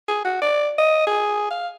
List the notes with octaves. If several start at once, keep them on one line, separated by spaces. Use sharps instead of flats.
G#4
F#4
D5
D#5
G#4
F5